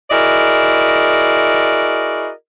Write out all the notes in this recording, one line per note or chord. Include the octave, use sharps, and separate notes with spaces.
E4 F#4 G#4 A#4 D5 D#5